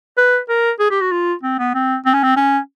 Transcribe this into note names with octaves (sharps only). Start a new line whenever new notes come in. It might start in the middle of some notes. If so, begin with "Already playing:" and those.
B4
A#4
G#4
G4
F#4
F4
C4
B3
C4
C4
C#4
C4
C#4